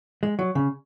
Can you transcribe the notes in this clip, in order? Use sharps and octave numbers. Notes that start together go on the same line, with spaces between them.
G#3
F#3
C#3